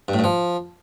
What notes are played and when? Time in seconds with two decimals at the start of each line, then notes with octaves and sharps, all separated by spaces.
0.08 G2
0.14 A2
0.19 G2
0.24 F3